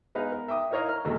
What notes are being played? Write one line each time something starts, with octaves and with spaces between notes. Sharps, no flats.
G#3 B3 D#4 B4 F5
A#4
E5 G5 D6 D#6
D#4 E4 A#4 C#5 D#5 F5
A#5 F6
E2 G#2 B2 D#3 A3 A#3